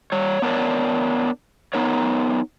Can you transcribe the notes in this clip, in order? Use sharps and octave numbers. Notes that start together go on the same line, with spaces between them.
G3 C#5
B3 D4 A#4 C#5 D5
B3 D#4 A#4 C#5